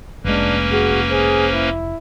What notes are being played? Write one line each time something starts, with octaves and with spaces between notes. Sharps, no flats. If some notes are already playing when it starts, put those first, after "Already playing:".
F1 G#3 A#3 C#4 D4 B4
F#4 G#4
G#4 C5
E4